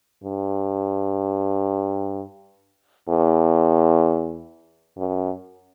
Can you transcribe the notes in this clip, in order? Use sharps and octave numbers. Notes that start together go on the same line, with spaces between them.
G2
E2
F#2